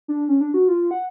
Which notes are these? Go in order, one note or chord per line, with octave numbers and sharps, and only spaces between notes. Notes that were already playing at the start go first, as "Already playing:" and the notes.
D4
C#4
D4
F#4
F4
F#5